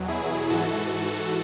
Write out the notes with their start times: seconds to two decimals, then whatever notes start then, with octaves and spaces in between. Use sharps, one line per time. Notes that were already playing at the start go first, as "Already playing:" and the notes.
Already playing: E2 B2 F#3
0.08 E4 G#4
0.50 G#2 E3 F#4 A4